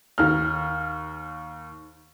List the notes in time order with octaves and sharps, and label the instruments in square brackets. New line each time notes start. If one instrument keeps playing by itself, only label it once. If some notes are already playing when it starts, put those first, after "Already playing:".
[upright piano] D#2 F6